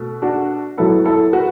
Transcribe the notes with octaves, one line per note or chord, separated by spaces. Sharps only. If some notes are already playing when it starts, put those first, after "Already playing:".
Already playing: B2 A3
D4 F#4
F#2 F#3 B3 E4 A4
E4 A4
F#4 B4